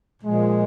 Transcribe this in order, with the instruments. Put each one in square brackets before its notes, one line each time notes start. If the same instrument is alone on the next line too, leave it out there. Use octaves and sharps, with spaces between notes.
[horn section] A#2 F3 G#3